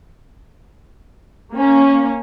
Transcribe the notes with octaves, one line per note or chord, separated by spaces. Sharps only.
A#3 C#4